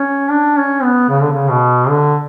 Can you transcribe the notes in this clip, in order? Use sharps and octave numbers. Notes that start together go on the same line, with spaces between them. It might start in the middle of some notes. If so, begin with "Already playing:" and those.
Already playing: C#4
D4
C#4
B3
C#3
D3
C#3
B2
D3